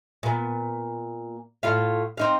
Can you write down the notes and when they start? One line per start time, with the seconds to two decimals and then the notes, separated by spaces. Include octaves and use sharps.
0.23 A#2 B3
1.63 A2 F4 F5
2.17 C4 D#4 F5